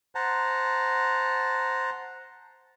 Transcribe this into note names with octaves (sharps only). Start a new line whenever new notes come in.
C5 F#5 A5 A#5